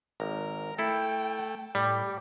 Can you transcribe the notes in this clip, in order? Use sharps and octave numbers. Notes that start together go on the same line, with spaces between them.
G#1 A#4
A3 E4 A4 G5
A2 G3 G4